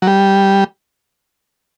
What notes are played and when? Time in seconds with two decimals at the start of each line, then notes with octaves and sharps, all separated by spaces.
0.02 F#3
0.07 G3